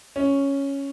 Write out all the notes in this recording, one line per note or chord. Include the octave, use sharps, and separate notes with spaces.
C#4